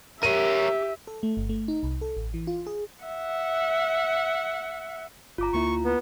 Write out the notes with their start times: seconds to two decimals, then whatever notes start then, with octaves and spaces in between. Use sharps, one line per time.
0.23 G4 A#4 C#5 E5 D#7
1.07 A4
1.23 A3
1.37 G1
1.49 A3
1.68 D#4
1.83 C2
2.01 A4
2.17 A1
2.34 E3
2.47 F4
2.67 G#4
3.04 E5 F#5
5.38 G1 F4 A#5 D6
5.53 D2 A#3 E4 C#6
5.85 B3